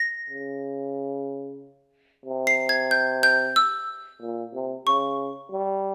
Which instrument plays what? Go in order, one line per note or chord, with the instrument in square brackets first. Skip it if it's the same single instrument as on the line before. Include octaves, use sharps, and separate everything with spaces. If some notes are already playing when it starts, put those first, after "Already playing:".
Already playing: [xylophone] A#6
[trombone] C#3
C3
[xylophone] C7
G#6
G6
G6
E6
[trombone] A#2
C3
[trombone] C#3 [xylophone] C#6
[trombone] G3